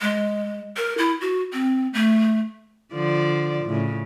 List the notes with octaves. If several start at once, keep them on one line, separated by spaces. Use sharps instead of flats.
G#3
A#4
E4
F#4
C4
A3
D3 F3 D5
A2 C#3